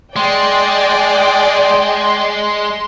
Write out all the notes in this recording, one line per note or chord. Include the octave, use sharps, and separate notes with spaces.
G#3 D5 G5 G#5 C6